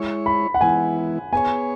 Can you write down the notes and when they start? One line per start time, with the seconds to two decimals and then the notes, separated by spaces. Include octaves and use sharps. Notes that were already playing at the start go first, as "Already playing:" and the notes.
Already playing: G#3 E4 C#5
0.26 B5
0.54 F#5
0.61 E3 G#3 B3 E4 G#5
1.33 B3 G#4 C#5 G#5